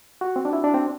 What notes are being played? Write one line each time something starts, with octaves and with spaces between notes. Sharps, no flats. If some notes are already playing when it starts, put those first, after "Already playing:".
F#4
C4
D4
E4
D4
C4